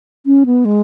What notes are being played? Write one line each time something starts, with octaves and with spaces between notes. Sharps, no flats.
C#4
B3
G#3